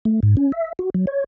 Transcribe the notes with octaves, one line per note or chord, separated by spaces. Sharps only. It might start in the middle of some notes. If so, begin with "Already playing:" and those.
A3
G#2
C#4
E5
F#4
F#3
C#5